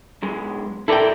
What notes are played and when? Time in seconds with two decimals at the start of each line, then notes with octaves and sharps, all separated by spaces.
0.22 B1 G#3
0.88 E4 A4 A#4 D5 G5